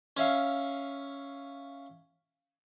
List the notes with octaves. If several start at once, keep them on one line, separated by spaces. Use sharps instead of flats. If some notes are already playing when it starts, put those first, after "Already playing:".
C#4 C#5 E5 F5